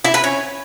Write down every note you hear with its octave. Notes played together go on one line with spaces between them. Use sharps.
E4
B4
C#4